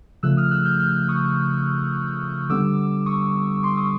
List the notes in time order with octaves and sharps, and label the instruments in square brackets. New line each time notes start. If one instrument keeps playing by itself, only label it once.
[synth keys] C#3 F3 A3 E6 F#6
D#6 F6
E6 F#6
F6 G6
F6 G6
C#6 D#6
D3 G3 B3 D6 E6
C#6 D#6
C6 D6
C#6 D#6